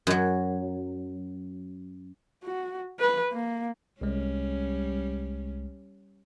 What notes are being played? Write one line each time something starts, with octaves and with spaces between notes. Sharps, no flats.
F#2 F#3
F#4
B4
A#3
C2 G3 G#3 C#4